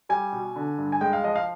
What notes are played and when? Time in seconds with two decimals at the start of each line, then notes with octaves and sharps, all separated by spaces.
0.09 G3 G#5
0.33 B2
0.56 D3
0.78 G2
0.92 G#5
1.01 G#3 G5
1.13 F5
1.24 F3 D#5
1.36 F5